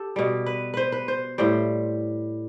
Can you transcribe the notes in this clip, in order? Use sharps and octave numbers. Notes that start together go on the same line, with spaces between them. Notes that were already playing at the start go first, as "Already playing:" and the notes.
Already playing: G4 A4
B2 G3
B4
B4 C5
B4
C5
A2 G3 C5